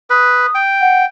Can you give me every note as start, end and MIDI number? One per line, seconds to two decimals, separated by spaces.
0.10 0.46 71
0.10 0.56 87
0.55 1.06 79
0.81 1.03 78